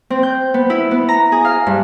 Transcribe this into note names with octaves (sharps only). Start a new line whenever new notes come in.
C4
G6
B3
E4
B3
A#5
G#4
F5
G2